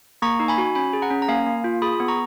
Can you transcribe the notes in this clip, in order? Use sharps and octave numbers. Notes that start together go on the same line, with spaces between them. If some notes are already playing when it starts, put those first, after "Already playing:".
A#3 A#5 C#6
D#4
G#5 B5
F#4
C#4 G#5 B5
G#4
F#5 A#5
C#4
A#5
A#3 F5 G#5
A#3
F4
G#4 B5 D#6
B3
A#5 C#6